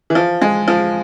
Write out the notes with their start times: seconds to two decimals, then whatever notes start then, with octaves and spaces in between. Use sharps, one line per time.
0.10 E3
0.15 F3
0.41 G#3
0.68 F3